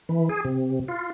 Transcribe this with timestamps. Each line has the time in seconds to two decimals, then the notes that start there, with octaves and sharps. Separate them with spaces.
0.09 E3
0.29 G#4
0.45 C3
0.88 F4